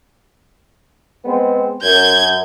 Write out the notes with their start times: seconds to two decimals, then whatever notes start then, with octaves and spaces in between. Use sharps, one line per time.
1.25 G#3 B3 C4
1.82 F#2 G6 G#6